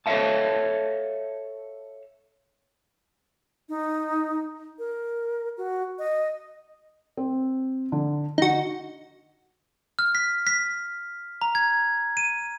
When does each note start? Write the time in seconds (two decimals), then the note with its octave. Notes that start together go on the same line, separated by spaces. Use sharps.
0.06 A4 C#5 D5 E5 F5 A5
3.69 D#4
4.79 A#4
5.57 F#4
5.99 D#5
7.17 C4
7.92 D3
8.38 D3 D#4 F#4
9.99 F6
10.15 B6
10.47 B6
11.42 A#5
11.55 G#6
12.17 D#7